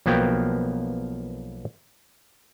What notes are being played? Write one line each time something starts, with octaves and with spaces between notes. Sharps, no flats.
B1 F3 A#3 B3 F#4 G5